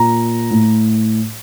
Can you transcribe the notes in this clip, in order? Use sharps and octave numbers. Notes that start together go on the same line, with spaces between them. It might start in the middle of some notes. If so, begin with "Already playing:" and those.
Already playing: A#2 A#5
A2